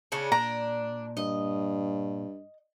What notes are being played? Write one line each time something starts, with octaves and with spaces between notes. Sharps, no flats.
C#3 C#4 D4
A#2 D4 A#5
G2 D#5